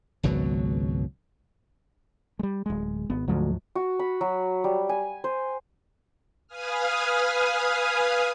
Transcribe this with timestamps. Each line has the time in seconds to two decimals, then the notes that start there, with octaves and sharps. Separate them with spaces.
0.23 G#1 C#2 B2 F#3
2.39 G3 G#3
2.66 D1 G#3
3.10 G#1 B3
3.28 D2 G#2 F3 F#3
3.75 F#4
3.99 B5
4.21 F#3
4.64 G3
4.89 G#5
5.24 C5
6.47 B4 F5 G#5 D#6 F6